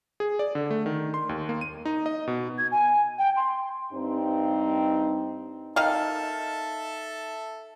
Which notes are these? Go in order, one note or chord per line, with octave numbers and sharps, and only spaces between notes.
G#4
D5
D3
A3
D#3
C6
D#2
A#3
D#7
D#4
D#5
B2
G#6
G#5
G5
C6
G2 C4 D#4
D#3 A4 E5 F5 A5